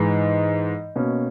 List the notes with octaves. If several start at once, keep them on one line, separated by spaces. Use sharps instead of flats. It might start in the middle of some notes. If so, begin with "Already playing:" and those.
Already playing: G#2 E3 G#3 D#4
B2 A#3 C#4